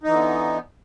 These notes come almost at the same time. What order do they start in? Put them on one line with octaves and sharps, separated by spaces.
D#4 E3 D3 B3